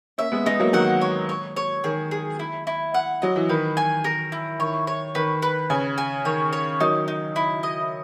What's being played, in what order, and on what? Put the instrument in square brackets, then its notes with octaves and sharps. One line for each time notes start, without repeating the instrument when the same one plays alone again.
[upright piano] A#3 C#4 [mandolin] E5
[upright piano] G#3 B3
[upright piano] G#3 B3 [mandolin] D#4
[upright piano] F#3 A#3
[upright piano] D#3 F#3 [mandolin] F#5
[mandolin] C#5
C#5
C#5
[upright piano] D#3 [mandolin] G#4
[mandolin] G#4
E4
E4
F#5
[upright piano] F#3 [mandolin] D#5
[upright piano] E3
[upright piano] D#3 [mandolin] B4
[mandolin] G#5
A#4
E4
[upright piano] D#3 [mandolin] C#5
[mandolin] C#5
[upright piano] D#3 [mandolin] B4
[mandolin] B4
[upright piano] C#3 [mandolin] G#5
[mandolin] G#5
[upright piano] D#3 [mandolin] C#5
[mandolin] C#5
[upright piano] D#3 F#3 [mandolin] D#4
[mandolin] D#4
E4
D#5